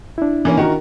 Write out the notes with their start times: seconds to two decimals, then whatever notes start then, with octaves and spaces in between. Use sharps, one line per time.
0.18 D4 E4
0.45 E3 A#3 C#4
0.57 D#3 F#4 A#4